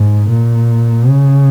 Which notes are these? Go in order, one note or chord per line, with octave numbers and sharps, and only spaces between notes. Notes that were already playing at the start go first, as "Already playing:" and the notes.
Already playing: G#2
A#2
C#3